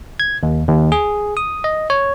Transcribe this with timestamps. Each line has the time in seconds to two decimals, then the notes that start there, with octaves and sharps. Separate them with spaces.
0.20 G#6
0.43 D#2
0.68 D#2
0.92 G#4
1.37 D#6
1.64 D#5
1.90 C#5